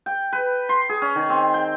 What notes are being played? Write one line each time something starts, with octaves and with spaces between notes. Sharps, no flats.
G5
B4
C6
G#4
C#4
D#3
C4
G5